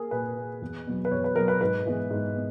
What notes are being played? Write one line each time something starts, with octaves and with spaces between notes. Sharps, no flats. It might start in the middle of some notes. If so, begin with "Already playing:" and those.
Already playing: A#3 G#4 A#4
A#2 B4
A#3
E2
B2 F#3 B3
B4
E2 C#5
B4
B2 F#3 B3 A#4
B4
G#2 B4
E3 G#3 B3
G#2
B3